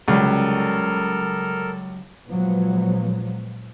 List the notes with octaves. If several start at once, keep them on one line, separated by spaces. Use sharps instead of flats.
C#2 C#3 F#3 G3 A4 A#4 F6
A#2 F3 F#3 G#3 B3